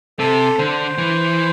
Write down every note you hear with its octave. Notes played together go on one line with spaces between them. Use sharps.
C3 A4
D3 C5
E3